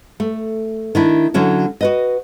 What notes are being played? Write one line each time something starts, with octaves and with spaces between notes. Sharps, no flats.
A3
D#3 D4 E4
D3 F#3 C#4 E4
F#4 B4 D#5